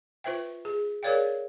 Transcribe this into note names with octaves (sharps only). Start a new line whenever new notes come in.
F4 B4 C5 E5 G5
G#4
G#4 A#4 C#5 D5 F5 G5